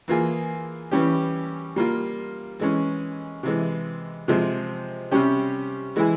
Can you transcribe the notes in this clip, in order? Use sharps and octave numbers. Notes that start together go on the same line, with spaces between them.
E3 A#3 F4 G#4
E3 G3 C#4 G4
G3 A#3 F4
E3 G#3 C#4
C3 E3 G#3
C3 F3 G#3
C3 G3 C#4 G4
E3 G#3 E4 G#4